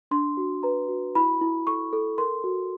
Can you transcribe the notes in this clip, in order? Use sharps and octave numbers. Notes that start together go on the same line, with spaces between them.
D4 C6
F#4
B4 A#5
F#4
E4 B5
E4
A4 C#6
A4
A#4 C6
F#4